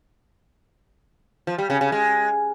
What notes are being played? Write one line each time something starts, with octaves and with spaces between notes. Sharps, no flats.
F3
G3
C#3
C#3
G#3